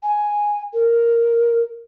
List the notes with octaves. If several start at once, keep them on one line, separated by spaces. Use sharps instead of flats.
G#5
A#4